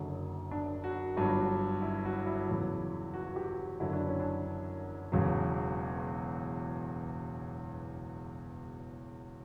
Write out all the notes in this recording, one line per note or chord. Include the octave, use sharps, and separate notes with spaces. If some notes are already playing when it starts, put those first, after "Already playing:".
Already playing: F#1 F#2 D3 F#3
D4
F#4
G1 G2 D3 F#3
E4
F#4
E4
E2 C#3 F#3
F#4
G4
F#4
F#1 F#2 D3 F#3 E4
D4
C#4
D4
E1 E2 C#3 F#3